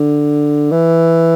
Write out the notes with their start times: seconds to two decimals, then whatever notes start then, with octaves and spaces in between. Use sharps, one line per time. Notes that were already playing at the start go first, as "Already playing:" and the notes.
Already playing: D3
0.72 E3